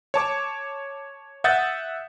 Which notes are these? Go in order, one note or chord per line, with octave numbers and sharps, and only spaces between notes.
C#5 A5 D6
E5 F#5 D#6 G6 A6